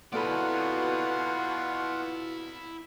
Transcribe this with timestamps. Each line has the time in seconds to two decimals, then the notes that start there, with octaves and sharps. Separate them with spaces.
0.13 B2 B3 E4 F4 A4 D5 F#5 B5